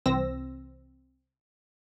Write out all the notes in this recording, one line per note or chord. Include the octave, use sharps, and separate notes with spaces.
C2 E3 C4 E6 A#6